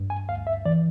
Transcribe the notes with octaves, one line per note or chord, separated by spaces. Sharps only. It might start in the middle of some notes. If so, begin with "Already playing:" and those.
Already playing: G2
G#5
D2 F5
E5
E3 D5